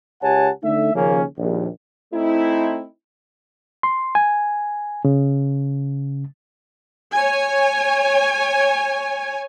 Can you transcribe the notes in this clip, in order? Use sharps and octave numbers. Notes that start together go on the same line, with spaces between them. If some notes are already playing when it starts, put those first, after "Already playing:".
C#2 G4 C#5 F#5 G#5 A5
D3 A3 D#4 E5
D#2 C#3 F3 A#3 C#4
A#1 D#2
A3 C4 D#4 E4
C6
G#5
C#3
C#5 G#5